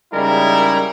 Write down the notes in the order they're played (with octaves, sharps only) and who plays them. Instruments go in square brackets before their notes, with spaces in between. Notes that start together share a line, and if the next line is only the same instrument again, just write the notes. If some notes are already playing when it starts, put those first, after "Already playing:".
[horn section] C#3 G3 G#3 D#4 E4 A#4